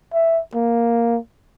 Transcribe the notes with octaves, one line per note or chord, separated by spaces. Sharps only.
E5
A#3